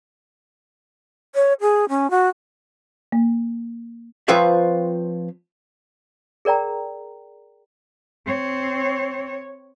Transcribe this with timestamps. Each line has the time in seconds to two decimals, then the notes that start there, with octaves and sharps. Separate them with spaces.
1.35 C#5
1.61 G#4
1.89 C#4
2.10 F#4
3.12 A#3
4.28 F3 C4 F4 B4 C#5 E5
6.45 G#4 A#4 D5 G5 A#5
8.26 C4 C#5